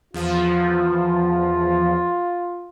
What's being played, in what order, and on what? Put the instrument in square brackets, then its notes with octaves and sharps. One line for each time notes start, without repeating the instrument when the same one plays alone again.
[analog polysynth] E2 F3 [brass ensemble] F4